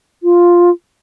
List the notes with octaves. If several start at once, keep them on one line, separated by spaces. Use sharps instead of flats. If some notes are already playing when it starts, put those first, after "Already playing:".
F4